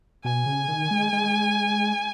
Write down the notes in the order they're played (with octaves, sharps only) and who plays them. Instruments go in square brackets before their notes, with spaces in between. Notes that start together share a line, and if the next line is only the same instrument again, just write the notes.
[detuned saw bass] B2 [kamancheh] G#5
[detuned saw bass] C#3
D#3
G#3
G#3